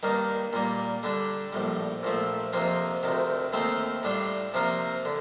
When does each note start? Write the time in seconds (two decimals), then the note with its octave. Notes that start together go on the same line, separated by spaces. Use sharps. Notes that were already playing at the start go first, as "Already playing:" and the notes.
0.03 G2 D#3 A#3
0.53 A#2 G3 A#3
1.03 D3 G3 D4
1.53 A#1 A2 G3
2.03 A#1 A#2 F3 A3
2.53 F2 C3 F3 A#3 F4
3.03 D2 C3 D#3
3.53 D#2 D#3 A3 C4 F4
4.03 A2 G3 D4 F4
4.54 C3 F3 A#3 F4 A#4
5.05 D3